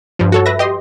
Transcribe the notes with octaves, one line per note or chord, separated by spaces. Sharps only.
G2 F3
F#4 A4 C#5
B4 E5 A#6
G4 D#5 C6